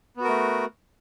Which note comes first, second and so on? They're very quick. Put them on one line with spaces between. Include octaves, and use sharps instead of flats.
B3 F#4 A#4 A3